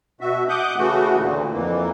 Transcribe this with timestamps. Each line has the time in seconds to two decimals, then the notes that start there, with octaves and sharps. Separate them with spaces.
0.21 B2 F#4 E5
0.49 F#5 D6 D#6 F#6 G6
0.78 C#3 E3 A3 F#4
1.17 D2 A#2 D3
1.52 F2 E3 A#3